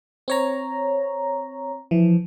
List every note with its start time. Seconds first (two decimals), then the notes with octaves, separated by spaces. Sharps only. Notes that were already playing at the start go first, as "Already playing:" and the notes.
0.28 C4 C#5 A#5
1.91 E3 F3